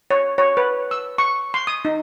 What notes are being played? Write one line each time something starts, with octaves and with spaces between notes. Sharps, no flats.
C#5
C#5
B4
E6
C#6
C6
D#6
D#4